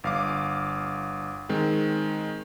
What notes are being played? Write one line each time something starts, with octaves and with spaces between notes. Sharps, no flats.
G1 F5 D6
D#3 G#3 C4